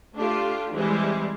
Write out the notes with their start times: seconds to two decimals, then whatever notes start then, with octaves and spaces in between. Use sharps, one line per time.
0.15 A3 D4 F4 G4
0.72 E3 G3 G#3 C4 E4